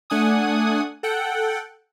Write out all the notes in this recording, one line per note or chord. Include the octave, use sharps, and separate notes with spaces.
A3 D4 F#5 G#5 D#6
A4 F#5 G5